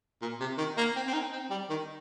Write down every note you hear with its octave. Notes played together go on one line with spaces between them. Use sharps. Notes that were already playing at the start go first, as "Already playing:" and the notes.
A#2
C3
D#3
A#3
C4
C4
D#4
C4
G3
D#3